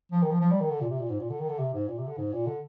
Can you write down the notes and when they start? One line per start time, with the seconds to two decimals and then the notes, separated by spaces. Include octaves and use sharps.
0.12 F3
0.22 D#3
0.31 F3
0.41 F3
0.51 G3
0.61 D#3
0.71 D3
0.81 A#2
0.90 C3
1.00 A#2
1.09 G#2
1.20 A#2
1.30 D3
1.40 D#3
1.49 D3
1.59 C3
1.74 G#2
1.88 A#2
1.98 C3
2.07 D3
2.18 G#2
2.33 A#2
2.47 D3